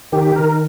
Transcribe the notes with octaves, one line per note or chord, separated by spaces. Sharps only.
D#3 G4
D#3 A#4